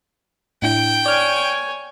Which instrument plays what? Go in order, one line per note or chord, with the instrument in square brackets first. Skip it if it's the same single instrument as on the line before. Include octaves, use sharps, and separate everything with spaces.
[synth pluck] A2 D4 E4 [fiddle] G5
[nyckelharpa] C#5 G#5 [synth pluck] D5 F6